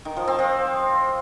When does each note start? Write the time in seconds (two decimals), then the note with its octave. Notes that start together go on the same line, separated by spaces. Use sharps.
0.05 D#3
0.16 F3
0.28 C4
0.39 F3